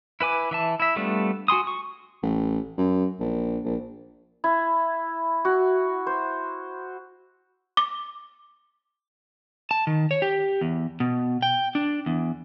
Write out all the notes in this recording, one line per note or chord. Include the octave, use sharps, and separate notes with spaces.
E4 B4 G#5 D6
E3 E5 A5
E4 E5
G3 A3 B3 D4 F4
F#4 G#5 C6 D#6
C#6
A1
F#2
A#1
A#1
E4
F#4
C5
D6
A5
D#3
C#5
G4
E2
B2
G5
D4
E2